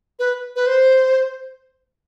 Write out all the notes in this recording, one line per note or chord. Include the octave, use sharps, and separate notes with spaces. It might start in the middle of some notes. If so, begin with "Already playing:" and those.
B4
B4
C5